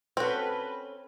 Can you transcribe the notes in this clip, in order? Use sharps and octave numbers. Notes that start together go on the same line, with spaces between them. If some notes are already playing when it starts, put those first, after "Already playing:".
C4 C#4 F#4 A4 B4